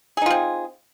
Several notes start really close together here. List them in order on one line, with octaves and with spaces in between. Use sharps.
G#4 D#4 F4 C4